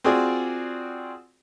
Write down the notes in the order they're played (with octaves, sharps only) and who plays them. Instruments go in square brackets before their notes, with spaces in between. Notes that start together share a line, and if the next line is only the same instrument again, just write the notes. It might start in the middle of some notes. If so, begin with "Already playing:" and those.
[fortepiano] C4 F4 F#4 G#4 D5